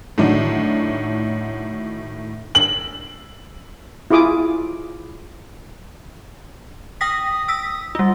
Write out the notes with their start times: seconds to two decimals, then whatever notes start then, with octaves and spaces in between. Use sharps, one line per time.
0.18 A2 D3 D#3 F#3 D4
2.55 F#7
4.11 E4 F4 G#4 D6 D#6
7.01 G5 D#6 A#6 B6
7.48 E6 B6
7.95 G3 F4